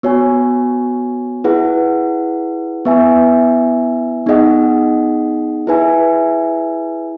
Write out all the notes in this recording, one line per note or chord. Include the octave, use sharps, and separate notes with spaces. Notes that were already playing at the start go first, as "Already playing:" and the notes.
B3 F#4 C#5 G#5
E4 G#4 B4 F#5
B3 E4 B4 E5 G#5
B3 D#4 G#4 D#5 F#5
E4 G#4 B4 E5 G#5